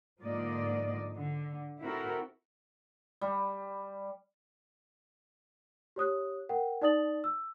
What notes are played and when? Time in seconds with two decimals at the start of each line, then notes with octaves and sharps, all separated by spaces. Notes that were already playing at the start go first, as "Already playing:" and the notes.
0.22 G#2 D3 F3 A#3 D5 D#5
1.15 D3
1.81 C4 E4 F#4 A4 A#4
3.21 G3
5.96 G4 C#5 D#6 F#6
6.49 A#4 F#5 G5
6.82 D#4 D5 A5 D#6 A6 F#7
7.24 E6